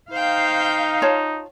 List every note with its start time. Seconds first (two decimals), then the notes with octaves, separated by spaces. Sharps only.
0.11 D#4 C5 F5 G5
1.02 F4 C#5 A5